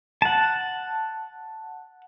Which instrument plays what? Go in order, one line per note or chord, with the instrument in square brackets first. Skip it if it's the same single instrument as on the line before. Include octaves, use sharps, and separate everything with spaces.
[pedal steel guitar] F#5 A5